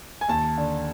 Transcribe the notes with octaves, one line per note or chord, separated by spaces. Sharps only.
G#5
D#2 A5
D3